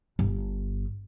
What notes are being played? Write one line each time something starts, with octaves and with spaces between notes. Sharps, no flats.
G1